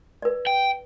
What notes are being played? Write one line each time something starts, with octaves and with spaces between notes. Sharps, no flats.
B4 D5
G5